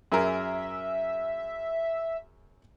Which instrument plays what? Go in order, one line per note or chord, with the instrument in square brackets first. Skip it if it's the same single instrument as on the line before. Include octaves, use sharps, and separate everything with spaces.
[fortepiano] F#2 G#4 A#4 [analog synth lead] E5